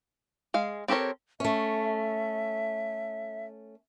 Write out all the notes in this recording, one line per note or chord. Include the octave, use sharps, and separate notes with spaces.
G#3 F5
C4 G4 A4 A#4 C#5
A3 C#4 E5